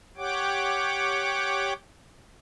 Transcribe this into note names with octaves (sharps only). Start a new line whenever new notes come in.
G4 C#5 F#5 G5 D6